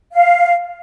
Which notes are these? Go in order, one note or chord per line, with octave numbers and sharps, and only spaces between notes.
F5